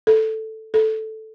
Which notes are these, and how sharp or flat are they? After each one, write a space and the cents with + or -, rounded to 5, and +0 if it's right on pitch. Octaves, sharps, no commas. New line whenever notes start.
A4 +0
A4 -5